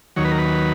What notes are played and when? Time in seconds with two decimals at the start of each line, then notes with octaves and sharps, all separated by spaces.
0.16 D#2 D#3 F#3 C#5
0.25 B4
0.31 A#4
0.38 B4